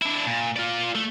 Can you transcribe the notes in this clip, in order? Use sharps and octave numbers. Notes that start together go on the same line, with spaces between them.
D4 E4
A#2
F4 D5
A3